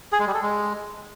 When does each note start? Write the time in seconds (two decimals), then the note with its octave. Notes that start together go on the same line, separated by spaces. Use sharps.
0.12 G#4
0.20 G#3
0.27 G3
0.34 A4
0.42 G#3